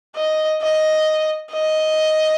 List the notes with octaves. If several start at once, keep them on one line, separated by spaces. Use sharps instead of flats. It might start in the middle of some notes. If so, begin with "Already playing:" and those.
D#5
D#5
D#5